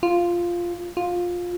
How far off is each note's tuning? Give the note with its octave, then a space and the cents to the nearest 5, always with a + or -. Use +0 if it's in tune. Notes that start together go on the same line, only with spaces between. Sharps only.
F4 -5
F4 +15